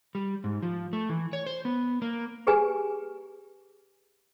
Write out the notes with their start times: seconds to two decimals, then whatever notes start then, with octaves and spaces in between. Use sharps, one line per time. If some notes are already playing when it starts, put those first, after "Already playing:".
0.15 G3
0.44 G#2
0.63 F3
0.93 A3
1.09 E3
1.33 C#5
1.46 C5
1.65 B3
2.02 A#3
2.47 G4 G#4 B4 G#5